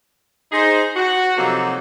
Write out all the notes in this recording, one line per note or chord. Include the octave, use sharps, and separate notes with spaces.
D#4 G#4 C5
F#4
C3 F3 F#3 A#3 D#4 A4